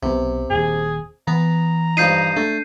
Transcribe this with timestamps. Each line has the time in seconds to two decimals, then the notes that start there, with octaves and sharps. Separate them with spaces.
0.03 B1 C3 B3
0.50 D#1 D#2 G#4
1.28 E3 B3 A#5
1.97 G2 F3 D#4 G6 C7 D#7
2.37 A3 D4